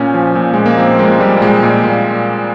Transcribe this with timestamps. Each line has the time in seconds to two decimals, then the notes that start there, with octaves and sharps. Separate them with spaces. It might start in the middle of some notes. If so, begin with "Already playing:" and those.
Already playing: A#2 C#4
0.14 F3
0.35 A#2
0.53 A#2 G#3
0.66 A#3
0.78 F3 C4
0.99 A#2 G#3
1.20 A#2 G3
1.41 A#2 G#3
1.63 A#2
1.84 A#2